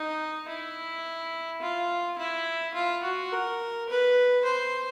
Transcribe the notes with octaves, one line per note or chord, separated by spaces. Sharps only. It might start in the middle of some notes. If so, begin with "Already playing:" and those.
Already playing: D#4
E4
F4
E4
F4
F#4
A#4
B4
C5